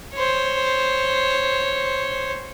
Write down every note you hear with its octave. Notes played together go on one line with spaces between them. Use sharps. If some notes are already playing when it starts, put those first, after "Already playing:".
C5 C#5